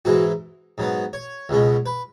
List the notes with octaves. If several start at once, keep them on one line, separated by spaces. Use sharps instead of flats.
G#2 E3 G#3 F#4
G#2 F#3 B3
C#5
C#2 B2 G#3 C#4
B4